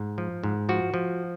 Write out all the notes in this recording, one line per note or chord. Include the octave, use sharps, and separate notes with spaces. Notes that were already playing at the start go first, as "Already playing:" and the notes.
Already playing: G#2
F3
G#2
F3 F#4
F3